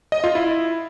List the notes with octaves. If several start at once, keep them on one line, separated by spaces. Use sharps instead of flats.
D#5
F4
E4